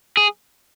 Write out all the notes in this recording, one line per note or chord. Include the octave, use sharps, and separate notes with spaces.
G#4